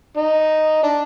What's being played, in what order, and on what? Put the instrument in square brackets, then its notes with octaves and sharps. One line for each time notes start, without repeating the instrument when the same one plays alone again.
[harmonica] D#4
D4